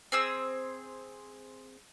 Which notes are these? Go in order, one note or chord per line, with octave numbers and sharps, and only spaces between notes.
C4 G#4 E6